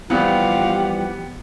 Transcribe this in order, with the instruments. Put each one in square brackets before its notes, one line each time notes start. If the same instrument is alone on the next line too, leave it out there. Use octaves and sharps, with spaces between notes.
[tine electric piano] E3 F3 G3 [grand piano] B3 [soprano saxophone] F4 [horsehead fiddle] G4 F#5